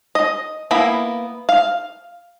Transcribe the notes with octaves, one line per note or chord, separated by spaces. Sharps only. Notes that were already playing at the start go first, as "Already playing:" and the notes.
D#5
A#3 B3 E4 B5
F5